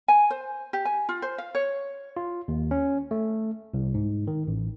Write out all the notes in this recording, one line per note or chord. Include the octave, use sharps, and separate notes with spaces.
G#5
C5
G4
G#5
F4
C5
F5
C#5
F4
D#2
C#4
A3
C2
G#2
D#3
A1